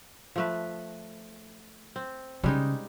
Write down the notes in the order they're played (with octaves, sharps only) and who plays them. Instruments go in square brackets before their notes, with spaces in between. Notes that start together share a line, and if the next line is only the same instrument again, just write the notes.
[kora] F3 A3 B4
C4
[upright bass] C#3 [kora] G3 G#3 D#4